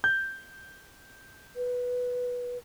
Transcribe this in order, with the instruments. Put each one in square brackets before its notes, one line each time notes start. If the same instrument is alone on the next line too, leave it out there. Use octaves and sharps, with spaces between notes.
[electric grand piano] G6
[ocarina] B4